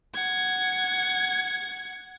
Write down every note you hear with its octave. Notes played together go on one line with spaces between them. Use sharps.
F#5 G#6